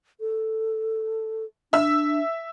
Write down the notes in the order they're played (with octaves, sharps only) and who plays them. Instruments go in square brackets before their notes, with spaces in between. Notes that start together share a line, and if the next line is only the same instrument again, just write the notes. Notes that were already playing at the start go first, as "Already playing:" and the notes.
[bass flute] A4
[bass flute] D4 [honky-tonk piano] E5 E6